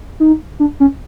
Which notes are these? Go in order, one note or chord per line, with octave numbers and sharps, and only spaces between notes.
D#4
D4
C#4